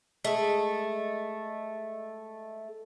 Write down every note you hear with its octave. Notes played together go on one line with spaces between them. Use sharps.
G#3 A3